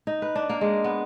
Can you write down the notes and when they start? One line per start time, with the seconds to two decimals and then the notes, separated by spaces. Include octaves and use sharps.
0.07 D#4
0.22 B4
0.35 D4
0.49 A#3
0.61 G#3
0.84 B3